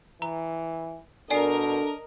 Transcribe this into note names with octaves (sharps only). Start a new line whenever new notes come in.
E3 A#5
B2 D4 A4 A#4 D5 D#5 G#5 C7